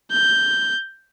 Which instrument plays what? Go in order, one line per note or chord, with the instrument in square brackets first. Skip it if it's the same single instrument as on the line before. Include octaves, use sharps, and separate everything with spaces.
[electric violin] G6